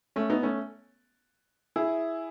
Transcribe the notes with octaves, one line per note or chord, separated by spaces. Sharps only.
A3 C#4
B3 D#4
A3 C#4
E4 G#4